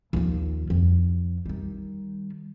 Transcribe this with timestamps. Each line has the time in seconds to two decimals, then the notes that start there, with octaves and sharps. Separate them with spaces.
0.13 D#2 F3
0.70 F2
1.46 D#3 G3